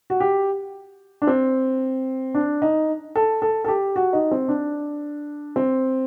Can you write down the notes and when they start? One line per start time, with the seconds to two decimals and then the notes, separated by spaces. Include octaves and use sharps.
0.10 F#4
0.20 G4
1.22 D4
1.27 C4
2.35 D4
2.62 D#4
3.16 A4
3.42 A4
3.64 A4
3.68 G4
3.96 F#4
4.13 D#4
4.31 C4
4.48 D4
5.56 C4